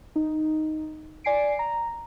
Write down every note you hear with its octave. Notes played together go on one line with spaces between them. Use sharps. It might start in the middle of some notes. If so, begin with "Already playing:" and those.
D#4
D5 G#5 C7 D7
A#5